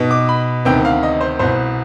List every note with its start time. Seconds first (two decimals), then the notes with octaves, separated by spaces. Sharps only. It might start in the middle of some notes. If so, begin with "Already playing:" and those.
Already playing: B2 B3 D#4
0.11 D6
0.29 B5
0.65 D2 C3 D#3 B3 G5
0.85 F5
1.03 D#5
1.21 C5
1.39 C2 B2 B3 C5